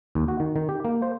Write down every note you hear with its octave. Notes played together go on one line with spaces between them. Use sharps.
D#2
F#4
D#3
D#3
G4
A#3
C5